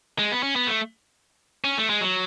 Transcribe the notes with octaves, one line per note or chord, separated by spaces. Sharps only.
G#3
B3
C#4
B3
A3
C#4
A3
G#3
F#3